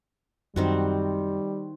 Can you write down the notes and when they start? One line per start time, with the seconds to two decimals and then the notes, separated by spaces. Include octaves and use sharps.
0.56 F#2 D#3 G3 C4 F#4